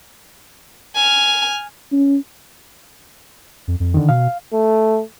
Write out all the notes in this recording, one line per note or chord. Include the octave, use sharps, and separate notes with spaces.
G#5 F6
C#4
F2
F2
D3 D#3
B2 F5
A3